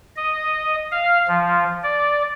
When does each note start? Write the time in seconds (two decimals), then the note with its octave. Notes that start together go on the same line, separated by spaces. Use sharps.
0.16 D#5
0.91 F5
1.28 F3
1.83 D5